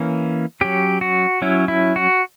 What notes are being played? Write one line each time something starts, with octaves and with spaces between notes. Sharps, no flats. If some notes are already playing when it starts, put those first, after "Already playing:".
Already playing: E3 A#3 C#4
F#3 C#4 G4
F#4
F#3 C#4 E4
E4
F#4